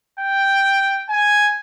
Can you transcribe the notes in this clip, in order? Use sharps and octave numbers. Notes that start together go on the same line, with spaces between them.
G5
G#5